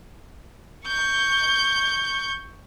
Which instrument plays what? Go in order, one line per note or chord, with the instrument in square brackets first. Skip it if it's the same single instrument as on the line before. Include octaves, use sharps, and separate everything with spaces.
[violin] C#6 G6